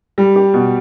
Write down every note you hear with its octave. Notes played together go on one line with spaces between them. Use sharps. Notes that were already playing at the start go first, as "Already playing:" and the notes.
G3
G4
B2